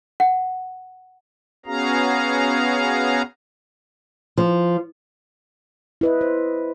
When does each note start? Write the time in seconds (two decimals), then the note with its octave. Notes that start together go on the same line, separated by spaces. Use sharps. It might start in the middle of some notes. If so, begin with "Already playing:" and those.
0.20 F#5
1.66 B3 C#4 F#4 G#4 F5 A#5
4.38 F3
6.01 E4 B4 D#5
6.21 C5